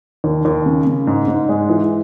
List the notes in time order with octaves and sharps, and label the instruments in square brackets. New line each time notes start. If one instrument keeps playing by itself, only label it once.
[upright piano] D#2
D#2
C#3
C#3
G#2
G#2
G#3
E3